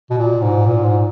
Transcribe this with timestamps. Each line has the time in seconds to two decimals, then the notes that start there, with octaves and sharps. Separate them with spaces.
0.10 B2
0.18 A#2
0.41 G#2
0.65 A#2
0.84 G#2